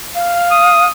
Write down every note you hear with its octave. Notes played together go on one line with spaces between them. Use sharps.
F5
D#6